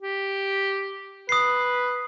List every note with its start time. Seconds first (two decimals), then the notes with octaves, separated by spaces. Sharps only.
0.02 G4
1.29 B4 D#6 C7